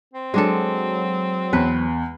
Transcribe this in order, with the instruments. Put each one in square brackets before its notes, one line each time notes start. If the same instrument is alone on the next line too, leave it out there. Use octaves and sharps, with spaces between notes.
[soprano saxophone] C4
[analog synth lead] F#3 [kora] G#3 D4 A4
[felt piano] E2 [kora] B4